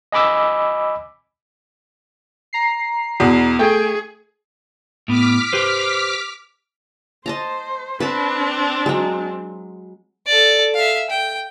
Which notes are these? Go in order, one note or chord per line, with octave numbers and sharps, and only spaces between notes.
D#5 G#5 B5 D6 E6
A#5 C7
E2 B2
A3 G#4 G5
A2 B3 D6 F6 B6
G4 B4 C5
C5 D#5 A5 A#5
C4 D4 B4 A5 B5
F#3 G#3
A4 D5
E5 F5
G5